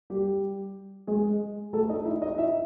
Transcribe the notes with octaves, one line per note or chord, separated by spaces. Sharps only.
G3 G4
G#3 G#4
A3 A4
D#4 D#5
E4 E5
D#4 D#5
E4 E5